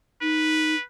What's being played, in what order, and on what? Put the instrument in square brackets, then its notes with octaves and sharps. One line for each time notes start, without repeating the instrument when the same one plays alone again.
[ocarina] D#4 [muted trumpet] B4